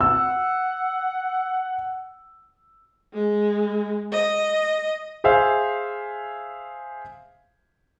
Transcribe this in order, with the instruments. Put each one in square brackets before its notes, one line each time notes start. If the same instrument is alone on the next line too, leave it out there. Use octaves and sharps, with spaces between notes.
[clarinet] F#5 [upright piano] E6
[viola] G#3
D#5
[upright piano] G#4 C5 E5 F5 G#5